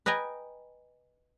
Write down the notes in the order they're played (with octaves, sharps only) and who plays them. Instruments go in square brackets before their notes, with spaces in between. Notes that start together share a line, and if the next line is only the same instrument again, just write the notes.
[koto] B4 D#5 G5 G#5 A#5